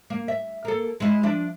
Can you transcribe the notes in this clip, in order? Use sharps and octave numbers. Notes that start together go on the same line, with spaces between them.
A#3
E5
A#3 A4
G#3 E4
F3 D4 E5